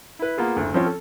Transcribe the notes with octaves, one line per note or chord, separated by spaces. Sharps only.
E4 B4
A#3 B3 F4 G#4
F#1 D2
F3 C4 C#4 F4
A4